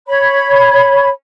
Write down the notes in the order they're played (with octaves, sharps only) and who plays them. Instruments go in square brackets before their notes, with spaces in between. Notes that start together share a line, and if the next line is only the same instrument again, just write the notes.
[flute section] C#5 B5